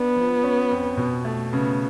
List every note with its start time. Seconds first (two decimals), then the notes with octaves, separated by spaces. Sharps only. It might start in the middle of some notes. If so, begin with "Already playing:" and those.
Already playing: B3 D4
0.16 F3
0.44 C#4
0.71 F2
0.97 B2
1.25 A3
1.53 C#3 B3